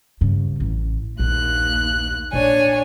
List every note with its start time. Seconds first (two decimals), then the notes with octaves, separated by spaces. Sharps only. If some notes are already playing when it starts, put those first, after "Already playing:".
0.21 G2 C#3
0.60 A1
1.19 A#1 D#2 F#6
2.33 A#1 D4 C#5 G#5